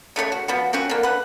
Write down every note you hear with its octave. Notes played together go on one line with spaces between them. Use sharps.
C#3 A3 F#4 C#5
F#4
F3 B3 F#4
C4 C#4 F4 F#4
D3 A#3
B4 F#5